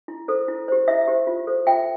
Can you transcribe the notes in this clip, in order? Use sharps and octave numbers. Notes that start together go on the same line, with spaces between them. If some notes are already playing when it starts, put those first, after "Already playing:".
E4
A4 C5
E4
G4 C5
E4 E5
G4 C5
F4
A4 C5
F4 E5 G5